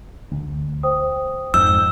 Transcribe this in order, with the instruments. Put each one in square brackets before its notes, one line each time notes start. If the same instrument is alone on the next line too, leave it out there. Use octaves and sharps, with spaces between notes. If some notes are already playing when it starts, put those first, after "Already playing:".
[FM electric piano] D2
[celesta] C5 G5 D#6
[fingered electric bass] F2 G#2 [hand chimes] E6 [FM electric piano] G6